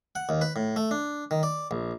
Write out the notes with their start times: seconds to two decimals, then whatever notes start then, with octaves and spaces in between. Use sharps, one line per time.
0.15 F#5
0.29 D#2
0.41 B4
0.56 A2
0.76 A3
0.91 D4
1.31 D#3
1.43 D5
1.71 A#1